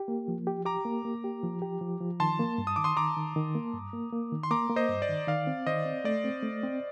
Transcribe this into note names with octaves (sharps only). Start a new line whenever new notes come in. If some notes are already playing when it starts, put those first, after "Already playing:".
Already playing: G4
A#3
F3
G4
G4 A#5 D6
A#3
A#3
G4
F3
G4
F3
F3
D#3 A5 C6
A#3
G2
D#6
D#3 D6
C6 D#6
D#3 A#5 D6
D#3
D#3
A#3
G2
A#3
A#3
D#3
C6
A#3 A#5 D6
A#3
C5 D#5
G2
D5
D#3
D#3 D5 F5
C4
D#3 C5 D#5
C4
A3 D5
C4
A3
C4